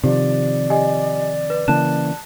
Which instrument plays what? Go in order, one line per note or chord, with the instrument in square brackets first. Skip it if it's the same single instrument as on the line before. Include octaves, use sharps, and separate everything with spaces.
[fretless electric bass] C3 D#3 F3 [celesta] G4 [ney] D5
[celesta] G4 D#5 G#5
B4
[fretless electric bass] C#3 E3 A#3 [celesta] A5 F#6 E7